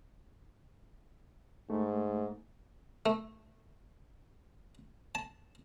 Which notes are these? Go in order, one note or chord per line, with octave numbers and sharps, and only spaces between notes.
G#2 A3
A3
A5